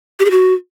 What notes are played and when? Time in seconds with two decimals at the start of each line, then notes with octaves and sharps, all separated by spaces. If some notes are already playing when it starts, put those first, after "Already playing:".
0.19 G4
0.25 G#4
0.31 F#4